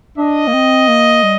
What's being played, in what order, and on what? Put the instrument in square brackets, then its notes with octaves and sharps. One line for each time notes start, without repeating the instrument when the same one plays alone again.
[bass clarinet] D4 [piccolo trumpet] D#5
[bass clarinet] A#3
C4
A#3
G3